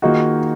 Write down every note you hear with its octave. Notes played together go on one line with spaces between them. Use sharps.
D#3 A#3 D#4 F4 F#4 G#4